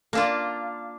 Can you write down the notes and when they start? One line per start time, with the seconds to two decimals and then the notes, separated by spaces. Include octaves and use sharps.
0.13 A#3 D4 F4